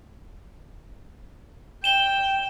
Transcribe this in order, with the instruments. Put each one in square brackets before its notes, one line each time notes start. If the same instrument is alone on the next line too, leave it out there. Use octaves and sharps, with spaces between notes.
[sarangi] G5 [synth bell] E7 G7